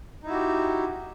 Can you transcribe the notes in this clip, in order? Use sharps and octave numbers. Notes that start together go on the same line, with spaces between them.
D#4 E4 F#4 G4